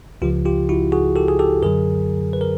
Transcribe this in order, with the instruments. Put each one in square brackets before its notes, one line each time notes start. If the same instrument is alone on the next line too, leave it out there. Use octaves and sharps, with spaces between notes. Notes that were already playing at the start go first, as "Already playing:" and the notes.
[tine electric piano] C#2 C#3 F3 F4 G4
F4 G4
E4 F#4
F#4 G#4
G4 A4
G#4
G4 A4
F#2 D3 F#3 G#4 A#4
B4
A#4